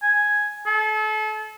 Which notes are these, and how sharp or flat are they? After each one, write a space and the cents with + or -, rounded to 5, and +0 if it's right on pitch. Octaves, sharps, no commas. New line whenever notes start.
G#5 +5
A4 -35